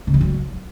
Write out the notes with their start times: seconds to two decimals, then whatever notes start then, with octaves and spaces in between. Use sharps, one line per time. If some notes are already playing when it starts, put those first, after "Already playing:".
0.07 C#3
0.14 F3
0.21 F#3